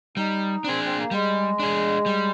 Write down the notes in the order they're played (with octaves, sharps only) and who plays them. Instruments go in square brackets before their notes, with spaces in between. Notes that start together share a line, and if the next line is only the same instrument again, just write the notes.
[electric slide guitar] G3 [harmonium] D#4
[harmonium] C4 [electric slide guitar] D4 G#4
[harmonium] C4
A#3
[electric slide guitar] G3 [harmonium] G#3
[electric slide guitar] D4 G#4
G3